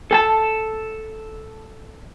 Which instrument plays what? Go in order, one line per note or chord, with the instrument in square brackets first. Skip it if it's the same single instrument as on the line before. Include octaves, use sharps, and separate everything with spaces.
[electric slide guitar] A4 G#5 A5